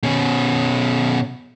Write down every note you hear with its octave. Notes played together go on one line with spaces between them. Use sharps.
B2 C#4